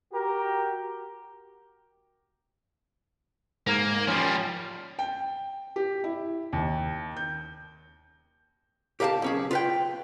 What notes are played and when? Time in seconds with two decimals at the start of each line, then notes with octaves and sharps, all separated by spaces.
0.12 F#4 G4 A#4
3.67 G#2 A#3 A#4 G#6
4.07 F3 G3 C#4
4.99 G5
5.76 G4
6.04 E4
6.53 D#2
7.17 G6
9.00 G4 A#4 F5 F#5 A5
9.22 B1 C#4 G#4
9.51 F4 B4 G5